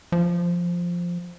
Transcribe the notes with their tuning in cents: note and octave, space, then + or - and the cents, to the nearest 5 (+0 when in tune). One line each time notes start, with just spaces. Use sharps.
F3 +0